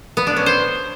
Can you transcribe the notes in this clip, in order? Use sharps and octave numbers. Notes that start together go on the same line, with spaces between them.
B3
D4
C#4
C5